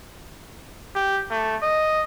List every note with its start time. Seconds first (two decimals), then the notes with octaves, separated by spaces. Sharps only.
0.95 G4
1.30 A3
1.62 D#5